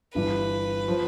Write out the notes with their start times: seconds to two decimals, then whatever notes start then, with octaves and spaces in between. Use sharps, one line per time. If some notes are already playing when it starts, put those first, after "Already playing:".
0.15 G1 G2 E3 B4
0.88 F3